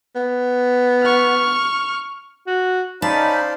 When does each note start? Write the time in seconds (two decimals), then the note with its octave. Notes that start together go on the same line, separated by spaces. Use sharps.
0.16 B3
1.03 C#6 F6
2.47 F#4
3.02 C#4 D#4 C5 D5 F5 A5 B5